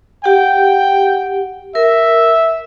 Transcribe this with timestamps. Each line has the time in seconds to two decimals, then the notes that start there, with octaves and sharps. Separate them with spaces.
0.24 G4 F#5 G5
1.75 A#4 E5